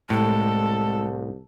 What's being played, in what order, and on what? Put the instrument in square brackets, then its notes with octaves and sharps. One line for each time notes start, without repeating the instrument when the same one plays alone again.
[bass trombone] C2 [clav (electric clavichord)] A2 [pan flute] G#3 [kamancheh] A4